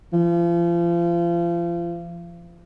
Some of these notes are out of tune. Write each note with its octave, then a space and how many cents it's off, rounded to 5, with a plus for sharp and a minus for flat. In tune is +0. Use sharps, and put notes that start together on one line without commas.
F3 -35